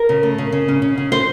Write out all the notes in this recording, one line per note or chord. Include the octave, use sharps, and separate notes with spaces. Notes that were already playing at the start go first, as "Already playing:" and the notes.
Already playing: A#4
C#3
A3
C#3
C#3
C#4
C#3
C#3
C#3 C5